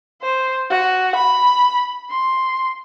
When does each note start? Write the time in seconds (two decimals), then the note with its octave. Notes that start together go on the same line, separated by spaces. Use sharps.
0.22 C5
0.70 F#4
1.15 B5
2.10 C6